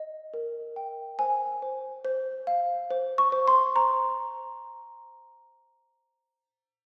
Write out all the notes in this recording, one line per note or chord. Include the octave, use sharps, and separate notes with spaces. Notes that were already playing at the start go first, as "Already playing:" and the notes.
Already playing: D#5
A#4
G5
C5 G#5
C5
C5
F5
C5
C#6
C5
C6
C5 A#5